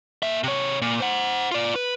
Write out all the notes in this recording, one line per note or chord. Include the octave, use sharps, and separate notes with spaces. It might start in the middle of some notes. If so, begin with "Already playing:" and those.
A#3 E5
C3 C#5
A#2
C5 F#5
F4 D5
B4